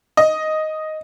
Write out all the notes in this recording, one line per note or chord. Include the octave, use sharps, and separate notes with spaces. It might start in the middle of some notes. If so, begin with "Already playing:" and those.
D#5